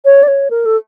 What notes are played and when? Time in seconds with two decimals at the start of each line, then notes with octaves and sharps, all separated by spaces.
0.05 C#5
0.23 D5
0.28 C#5
0.50 A#4
0.65 A4